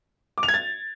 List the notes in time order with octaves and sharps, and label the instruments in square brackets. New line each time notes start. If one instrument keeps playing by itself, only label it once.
[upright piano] D6
F7
G#6
A6